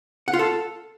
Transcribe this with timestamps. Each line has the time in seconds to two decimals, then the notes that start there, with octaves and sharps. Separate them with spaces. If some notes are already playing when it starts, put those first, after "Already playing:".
0.28 F#5
0.33 F4
0.39 A4